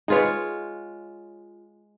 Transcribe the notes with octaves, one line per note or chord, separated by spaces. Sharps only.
G#3 D#4 F4 G#4 B4 C#5